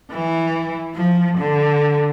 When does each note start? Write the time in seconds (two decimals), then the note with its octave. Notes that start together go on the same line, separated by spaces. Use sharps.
0.11 E3
0.95 F3
1.38 D3